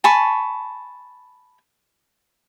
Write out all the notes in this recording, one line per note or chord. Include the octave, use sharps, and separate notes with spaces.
G#5 A5 B5 C#6